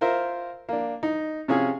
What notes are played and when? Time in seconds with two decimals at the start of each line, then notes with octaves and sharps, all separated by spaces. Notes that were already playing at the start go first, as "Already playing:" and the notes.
0.01 F4 A#4 C5 E5
0.69 A#3 D4
1.03 D#4
1.48 C3 C#4 F4 G#4